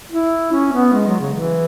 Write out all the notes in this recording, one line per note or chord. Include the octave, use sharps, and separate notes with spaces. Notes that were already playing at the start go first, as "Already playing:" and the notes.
E4
C#4
B3
G#3
F#3
C#3
E3